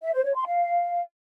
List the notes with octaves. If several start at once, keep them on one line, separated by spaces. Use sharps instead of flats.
E5
C5
C#5
C6
F5